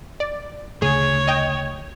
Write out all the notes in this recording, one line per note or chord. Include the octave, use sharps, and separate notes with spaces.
D5
D2 C#3 A3 G#4 C#5
D#5 G5